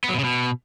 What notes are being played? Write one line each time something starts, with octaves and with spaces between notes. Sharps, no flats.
B3
F#3
B2
C#3
B2